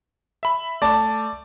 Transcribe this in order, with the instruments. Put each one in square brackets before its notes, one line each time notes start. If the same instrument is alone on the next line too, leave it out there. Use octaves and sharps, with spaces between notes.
[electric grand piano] E5 B5
[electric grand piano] A3 [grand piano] D5 A5